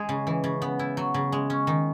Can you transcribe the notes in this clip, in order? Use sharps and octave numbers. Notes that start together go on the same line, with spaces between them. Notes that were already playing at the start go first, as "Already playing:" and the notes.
Already playing: G#3 G#4
C#3
E3
C#3
B3
E4
F#3
C#3
G#3
C#4
D#3